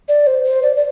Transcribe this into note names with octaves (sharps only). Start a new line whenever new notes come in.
D5
C5
C5
D5
D5